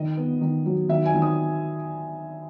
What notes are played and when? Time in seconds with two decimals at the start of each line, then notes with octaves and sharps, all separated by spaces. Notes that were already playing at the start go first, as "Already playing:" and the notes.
Already playing: D#3 D#5
0.17 B3
0.41 D#3
0.66 F#3
0.89 D#3 E5
1.05 G#5
1.14 D#3
1.22 D#6